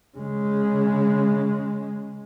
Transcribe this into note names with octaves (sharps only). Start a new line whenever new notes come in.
C#3 G#3